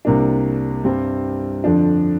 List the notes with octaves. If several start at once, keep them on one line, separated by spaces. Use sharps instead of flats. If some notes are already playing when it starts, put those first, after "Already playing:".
C2 C3 A#3 D4
G2 G3 C4
F2 D3 F3 D4